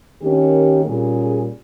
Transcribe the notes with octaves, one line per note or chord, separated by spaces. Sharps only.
D#3 A#3 C#4 G4
A#2 G3 C#4 G#4